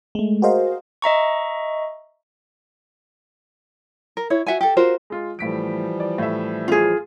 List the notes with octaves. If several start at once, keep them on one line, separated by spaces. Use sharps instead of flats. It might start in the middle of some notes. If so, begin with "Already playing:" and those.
G#3 A3
F#4 G#4 A#4 C5 D#5 F5
D#5 E5 A#5 C#6
A#4
E4 C#5
F#4 E5 F#5 G#5
G4 A4
F4 F#4 A#4 C5
G#3 F4
A2 E3 F3 G3 B6 D7
D5
A2 E5
F4 G#4